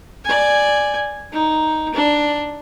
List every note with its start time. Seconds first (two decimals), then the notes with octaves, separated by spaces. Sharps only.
0.25 D5 G#5
1.32 D#4
1.94 D4